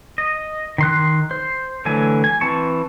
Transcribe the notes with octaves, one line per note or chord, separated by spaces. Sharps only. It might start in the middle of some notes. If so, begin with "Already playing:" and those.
D#5
D#3 C6 F#6
C5
D3 E3 F#3 A3 G#5
G#5
E3 C4 A5 C#6